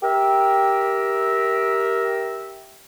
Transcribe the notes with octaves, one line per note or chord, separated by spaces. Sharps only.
G4 A#4 E5